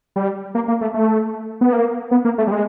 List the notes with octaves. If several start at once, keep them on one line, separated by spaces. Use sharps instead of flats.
G3
A#3
A#3
A3
A3
B3
A#3
B3
A#3
A3
G3
G#3